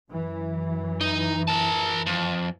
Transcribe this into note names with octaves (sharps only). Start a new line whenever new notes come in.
F#2 E3
D#4
A#4 A5
F2